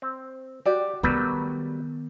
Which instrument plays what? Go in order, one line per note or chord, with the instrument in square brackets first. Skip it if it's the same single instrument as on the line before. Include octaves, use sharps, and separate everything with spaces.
[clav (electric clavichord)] C4
[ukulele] F#4 D5 [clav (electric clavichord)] G4
[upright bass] D#3 B3 [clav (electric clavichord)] F#3 G3 A3 [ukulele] B4